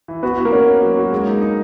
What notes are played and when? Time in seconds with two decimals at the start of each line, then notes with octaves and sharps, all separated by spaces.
0.08 E3
0.23 B3 F#4 B4
0.37 F#4
0.45 A#3 A#4
0.52 C#4
0.68 C#4
0.82 F#3
0.97 F#4
1.12 G#3
1.27 D#4
1.42 D#4